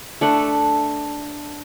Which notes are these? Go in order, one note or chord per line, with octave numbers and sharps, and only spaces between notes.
A3 D4 F#5